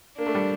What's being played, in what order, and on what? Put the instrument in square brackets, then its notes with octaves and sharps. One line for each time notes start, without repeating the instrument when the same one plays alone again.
[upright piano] A#3 [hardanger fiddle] D4
[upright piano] A3
G3